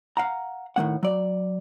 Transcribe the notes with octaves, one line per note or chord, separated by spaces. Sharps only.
F5 F#5 A#5
A2 D#3 A#3 F#5
F#3 D5